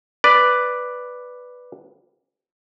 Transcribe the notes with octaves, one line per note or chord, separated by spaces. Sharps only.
B4 D5